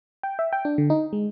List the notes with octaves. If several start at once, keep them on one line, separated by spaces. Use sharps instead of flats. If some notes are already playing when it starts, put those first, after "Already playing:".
G5
E5
G5
D4
D3
D#4
G#3